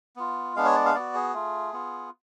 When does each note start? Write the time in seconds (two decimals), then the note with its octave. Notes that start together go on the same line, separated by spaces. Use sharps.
0.16 B3 F4
0.56 G#3 B3 D4 F5
0.66 C#5
0.75 D5
0.86 F5
0.95 B3 F#4 D5
1.14 G#4
1.34 A3 F4
1.73 B3 F4